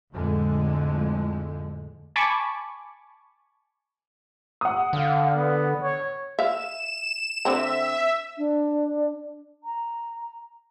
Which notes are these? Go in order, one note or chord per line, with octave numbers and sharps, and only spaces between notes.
F2 A2 D3 G#3
G#5 A5 B5 C#6 D6
F#5 D#6
D3 F5
B3
C#5
E5 F5 E7
D3 C4 E5 A#5
D4
A#5